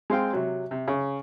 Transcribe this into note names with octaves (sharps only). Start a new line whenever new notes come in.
G#3 C4 F5 G5
C3 F#3
C3
C#3